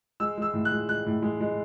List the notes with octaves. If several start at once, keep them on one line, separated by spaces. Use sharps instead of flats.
G#3 E6
G#3 E6
A2
F#6
G#3
G#3 F#6
A2
G#3
G#3